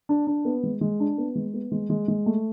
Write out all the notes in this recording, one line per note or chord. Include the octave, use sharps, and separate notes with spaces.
D4
D4
B3
G#3
G#3
D4
B3
G#3
B3
G#3
G#3
G#3
A3